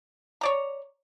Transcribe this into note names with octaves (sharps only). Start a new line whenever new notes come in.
C#5 D5 A#5